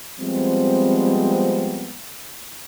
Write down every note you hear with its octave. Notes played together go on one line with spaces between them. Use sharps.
F3 G3 G#3 B3 C4